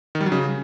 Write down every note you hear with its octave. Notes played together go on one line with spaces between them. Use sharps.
D#3
G3
F#3
C#3